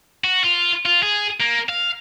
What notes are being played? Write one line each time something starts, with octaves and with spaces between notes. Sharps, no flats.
F#4
F4
F4
G#4
A#3
F5